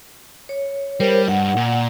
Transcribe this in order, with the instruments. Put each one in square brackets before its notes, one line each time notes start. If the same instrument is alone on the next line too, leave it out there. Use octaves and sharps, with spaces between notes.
[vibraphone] C#5
[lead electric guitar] G3 [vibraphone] A#4 C5 C#5
[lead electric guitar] G2 [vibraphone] F#5
[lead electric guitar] A#2